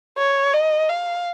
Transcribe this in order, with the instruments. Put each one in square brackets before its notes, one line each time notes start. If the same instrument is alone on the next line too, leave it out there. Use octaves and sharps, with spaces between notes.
[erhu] C#5
D#5
F5